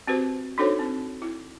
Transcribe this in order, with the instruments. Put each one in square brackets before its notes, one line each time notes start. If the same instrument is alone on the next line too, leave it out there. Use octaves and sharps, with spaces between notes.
[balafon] C4 F#4 G4 B4 C5
D4 D#4 F#4 A4 C5 C#5
C4
E4